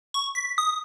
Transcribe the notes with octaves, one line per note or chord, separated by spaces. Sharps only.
C#6
B6
D#6